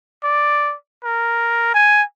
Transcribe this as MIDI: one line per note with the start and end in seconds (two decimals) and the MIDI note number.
0.23 0.75 74
1.04 1.73 70
1.74 2.03 80